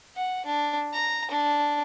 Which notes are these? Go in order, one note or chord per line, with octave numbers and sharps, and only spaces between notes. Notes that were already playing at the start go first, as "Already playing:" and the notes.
F#5
D4
A#5
D4